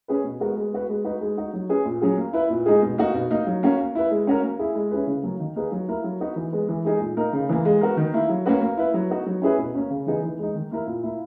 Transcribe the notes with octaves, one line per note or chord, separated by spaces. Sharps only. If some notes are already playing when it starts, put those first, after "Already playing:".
C#4 G#4 B4
B2
G#3 B3 F#4 A#4
G#3
B3 F#4 B4
G#3
D#4 F#4 B4
G#3
D#4 F#4
F#3
C#4 G#4 B4
A#2
F#3 C#4 G#4
A#3
E4 B4
A#2
G#3 D#4 G#4
B2
A#3 D#4 F#4
B2
A#3 D#4
F#3
A#3 C#4 F#4
A#3
E4 B4
G#3
C#4 F#4 A#4
A#3
E4 G#4
G#3
C#4 E4 G#4 B4
C#3
F#3 A#3
D#3
A#3 D#4 G#4 B4
F#3
A#3 E4 A#4
F#3
B3 D#4 F#4 B4
E3
G#3 B3
E3
G#3 D#4 G#4
A#2
A#3 D#4 A#4
C#3
E3 A#3
G#3
B3 F#4 A#4
D#3
A#3 E4
F#3
A#3 C#4 F#4 B4
A#3
E4 B4
F#3
B3 D#4 F#4 B4
F#3
C#4 E4 G#4 B4
B2
A#3 C#4
C#3
E3 B3 D#4 G#4
E3
G#3 D#4
D#3
A#3 E4 A#4
A#2
A#3 E4